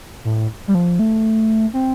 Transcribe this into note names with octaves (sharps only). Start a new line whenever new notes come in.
A2
G3
F3
A3
C4